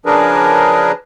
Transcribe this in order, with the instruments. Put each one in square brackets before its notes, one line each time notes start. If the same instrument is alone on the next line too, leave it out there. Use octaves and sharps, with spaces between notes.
[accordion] C#3 F3 D4 G#4 A#4 B4